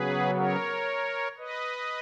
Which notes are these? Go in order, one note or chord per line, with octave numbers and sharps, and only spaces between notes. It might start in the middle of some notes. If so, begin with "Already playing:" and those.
Already playing: C#3 F#3 B3 G#4 B4
A#4 C#5
B4 D#5